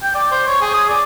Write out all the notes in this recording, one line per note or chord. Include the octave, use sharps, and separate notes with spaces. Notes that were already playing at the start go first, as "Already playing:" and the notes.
G5
D5
C5
C#5
G#4
D#6
D5